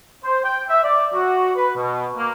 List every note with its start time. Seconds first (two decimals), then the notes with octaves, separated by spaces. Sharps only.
0.24 C5
0.44 G5
0.69 E5
0.84 D5
1.14 F#4
1.56 B4
1.77 B2
2.17 A#3